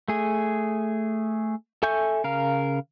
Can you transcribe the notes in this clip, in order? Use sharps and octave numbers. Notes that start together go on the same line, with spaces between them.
A3 G#4
A4 E5 G#5 C#6 G6
C#3 A#4 F5